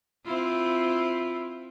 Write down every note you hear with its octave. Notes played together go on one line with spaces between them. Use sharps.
C4 E4 F4